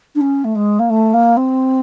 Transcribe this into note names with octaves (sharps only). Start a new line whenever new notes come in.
D4
C#4
A3
G#3
A#3
A3
A#3
C4